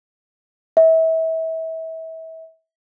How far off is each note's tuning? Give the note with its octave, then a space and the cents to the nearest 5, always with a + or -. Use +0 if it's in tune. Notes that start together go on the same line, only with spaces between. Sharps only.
E5 -30